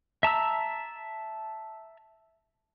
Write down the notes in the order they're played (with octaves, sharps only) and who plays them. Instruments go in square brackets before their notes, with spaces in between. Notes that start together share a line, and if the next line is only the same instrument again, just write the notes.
[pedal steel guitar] E5 A5 A#5 E6